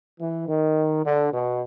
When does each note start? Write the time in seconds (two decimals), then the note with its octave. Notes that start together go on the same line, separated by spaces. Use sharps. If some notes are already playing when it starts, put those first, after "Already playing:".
0.19 E3
0.47 D#3
1.04 D3
1.32 B2